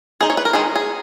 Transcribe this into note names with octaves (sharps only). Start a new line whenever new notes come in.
G#3 D#4 G#4
C#5
B4
A#4
D#3 G#3 D#4 G#4
G#4